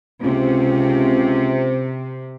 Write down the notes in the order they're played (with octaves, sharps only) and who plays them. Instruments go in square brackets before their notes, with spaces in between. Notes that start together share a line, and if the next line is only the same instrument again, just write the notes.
[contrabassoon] C#2 [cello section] C3